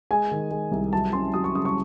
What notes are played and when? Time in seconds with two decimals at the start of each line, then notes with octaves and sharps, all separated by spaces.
0.11 G#3 G#5
0.31 D#3
0.51 G#3
0.72 C2
0.93 F#3 A5
1.13 C#4 C6
1.34 F#3 D#6
1.44 C#6
1.55 C#3 D#6
1.65 C#6